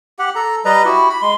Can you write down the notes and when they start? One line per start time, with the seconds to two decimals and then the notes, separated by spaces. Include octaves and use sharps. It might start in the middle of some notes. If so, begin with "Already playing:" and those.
0.19 G4 F#5
0.35 A4 A#5
0.65 G3 B4 D#5 A#5
0.85 E4 F#4 G4
1.10 B5
1.22 G#3 C6